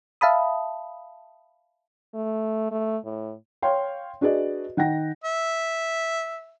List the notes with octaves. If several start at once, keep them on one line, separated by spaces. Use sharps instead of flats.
E5 F5 A5 B5 D#6
A3
A3
A2
C#5 F5 G5 C6
D4 F#4 G#4 B4 D5 D#5
D#3 F#5 G5 A#6
E5